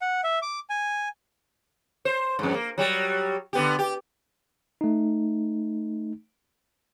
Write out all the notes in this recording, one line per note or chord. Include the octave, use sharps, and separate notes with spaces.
F#5
E5
D6
G#5
C5
F2 G#2
A#3
F#3 G3
D3 B3 G4
G4
A3 D#4